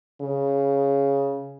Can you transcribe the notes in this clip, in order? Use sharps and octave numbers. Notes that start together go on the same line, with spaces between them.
C#3